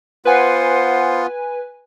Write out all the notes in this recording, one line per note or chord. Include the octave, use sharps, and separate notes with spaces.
B3 F4 B4 C5 F#5 G#5